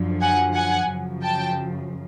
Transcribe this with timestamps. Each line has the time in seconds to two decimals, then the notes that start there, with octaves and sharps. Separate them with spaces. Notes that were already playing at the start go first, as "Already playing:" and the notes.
Already playing: F#2 D3 F3
0.21 F#5 G#5
0.54 F#5 G#5
0.89 F#2 C#3 F3
1.23 G5 A5